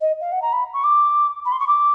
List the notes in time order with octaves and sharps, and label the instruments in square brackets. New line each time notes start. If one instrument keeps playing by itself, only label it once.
[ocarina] D#5
F5
F#5
A#5
B5
C#6
D6
B5
C6
C#6
D6